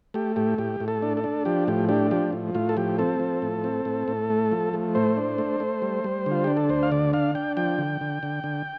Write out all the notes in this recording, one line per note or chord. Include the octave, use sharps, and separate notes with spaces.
A3 G4
A2 G4
A2 G4
A2
A4
D4
A4
D4
F3 G4
A2 G4
D4 G4
F3 G4
A2
A2 F4
A4
F3 G4
C4 A4
F3
A2
C4
A2
A2
A3
F3
A3
A2 C5
D4
A3
A3
G3
G3
D3
F4
D4 G4
A4
D2 C5
F5
D3 D5
D4 F5
D4 G5
F3 G5
D3
D3
D3
D3